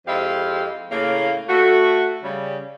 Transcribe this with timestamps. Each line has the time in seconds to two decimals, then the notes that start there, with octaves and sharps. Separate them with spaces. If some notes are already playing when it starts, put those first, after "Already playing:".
0.07 F2 G#3 E4 G4 F5
0.91 A2 C#3 A#3
1.49 A3 F#4
2.23 C#3 G3